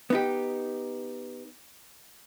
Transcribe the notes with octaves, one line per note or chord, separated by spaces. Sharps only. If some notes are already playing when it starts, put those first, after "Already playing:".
B3 D#4 G4